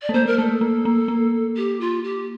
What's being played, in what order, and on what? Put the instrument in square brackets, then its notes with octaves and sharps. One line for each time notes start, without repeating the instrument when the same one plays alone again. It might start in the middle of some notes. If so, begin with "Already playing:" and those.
[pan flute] D5
[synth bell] A3
[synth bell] A#3 [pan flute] C5
[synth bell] A#3 [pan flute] A#4
[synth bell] A3 [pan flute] A4
[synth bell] A#3
A#3
A#3
[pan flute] G4
F4
G4